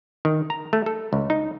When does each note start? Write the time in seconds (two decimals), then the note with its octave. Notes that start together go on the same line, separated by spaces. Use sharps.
0.25 D#3
0.50 A#5
0.73 A3
0.86 A4
1.13 C#2
1.30 D#4